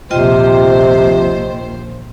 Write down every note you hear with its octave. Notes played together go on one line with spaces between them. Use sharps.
A#1 D#2 C3 F4 C5 D#5 G5